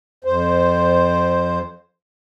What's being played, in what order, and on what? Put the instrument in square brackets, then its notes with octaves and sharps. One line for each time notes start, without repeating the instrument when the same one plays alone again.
[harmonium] F2 C5